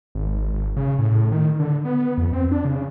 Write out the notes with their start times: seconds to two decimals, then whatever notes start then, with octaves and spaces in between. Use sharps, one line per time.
0.15 G#1
0.54 G#1
0.76 C#3
0.99 A2
1.32 D#3
1.60 D3
1.85 B3
2.18 F2
2.33 C4
2.51 D4
2.65 C#3